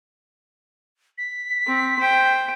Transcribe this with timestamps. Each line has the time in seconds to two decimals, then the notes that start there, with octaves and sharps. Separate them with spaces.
1.18 B6
1.67 C4
1.99 C5 G5